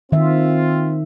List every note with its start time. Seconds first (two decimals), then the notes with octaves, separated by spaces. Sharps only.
0.12 D#3 C4 F4 E5